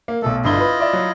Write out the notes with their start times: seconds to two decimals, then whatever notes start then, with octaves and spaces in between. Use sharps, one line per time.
0.08 A#3
0.22 B1 B2 A3 A4
0.45 G1 D3 E4 F4 D#5 G7
0.60 B4
0.80 D5 E5
0.93 F#3